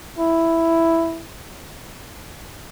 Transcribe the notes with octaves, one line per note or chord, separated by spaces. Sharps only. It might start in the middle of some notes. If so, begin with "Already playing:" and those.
E4